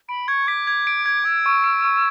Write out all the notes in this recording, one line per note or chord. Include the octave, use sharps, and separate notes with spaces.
B5 D7
C#6 G#6
D6 B6
G#6
D7
G#6
E6 G#6
C#6
D7
C#6